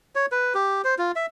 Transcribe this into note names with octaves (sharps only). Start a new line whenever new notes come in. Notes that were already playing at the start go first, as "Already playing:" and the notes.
C#5
B4
G4
C5
F4
E5